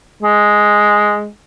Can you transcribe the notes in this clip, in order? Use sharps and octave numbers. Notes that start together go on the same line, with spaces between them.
G#3